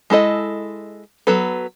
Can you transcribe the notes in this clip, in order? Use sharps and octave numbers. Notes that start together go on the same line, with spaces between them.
G#3 E4 A4 D#5
F#3 B3 A4 B4